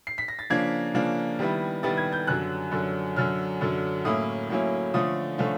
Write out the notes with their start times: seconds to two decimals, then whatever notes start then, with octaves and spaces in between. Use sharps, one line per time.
0.07 C7
0.18 B6
0.28 A#6
0.39 A6
0.50 C#3 F3 A#3 D4 G#6
0.95 C#3 F3 A#3 D4
1.39 D#3 G3 B3 E4
1.83 D#3 G3 B3 E4 A6
1.98 G#6
2.13 G6
2.27 F#2 D3 F#3 F#6
2.72 F#2 D3 F#3
3.16 F#2 D3 F#3 F6
3.61 F#2 D3 F#3
4.05 A2 F#3 A#3 C#4 E4 D#6
4.49 A2 F#3 A#3 C#4 E4
4.94 D3 F3 A3 C#4 F4 D#6
5.38 D3 F3 A3 C#4 F4